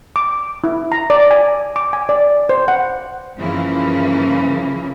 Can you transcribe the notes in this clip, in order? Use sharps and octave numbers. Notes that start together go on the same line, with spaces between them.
D6
E4
A#5
D5
G#5
D6
G#5
D5
C5
F#5
G2 C#3 E3 F3 A#3 E4